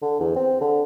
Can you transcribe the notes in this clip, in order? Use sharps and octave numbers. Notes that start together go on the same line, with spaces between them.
D3
E2
C4
D3